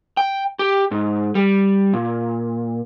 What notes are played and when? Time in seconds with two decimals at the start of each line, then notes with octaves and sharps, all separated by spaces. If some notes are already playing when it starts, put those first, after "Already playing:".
0.17 G5
0.59 G4
0.91 G#2
1.35 G3
1.94 A#2